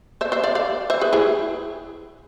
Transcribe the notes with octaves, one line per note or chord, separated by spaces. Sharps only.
C5 E5
C5 E5
D5 F5
D5 F5
C5 E5
G#4 B4
E4 G#4